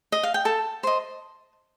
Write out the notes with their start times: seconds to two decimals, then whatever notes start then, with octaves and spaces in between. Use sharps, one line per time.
0.12 D#5
0.23 F5
0.34 G5
0.45 A4 A5
0.83 C5 D#5